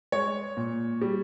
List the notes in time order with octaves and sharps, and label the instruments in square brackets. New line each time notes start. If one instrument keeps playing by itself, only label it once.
[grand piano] G#3 C#5
A#2
G3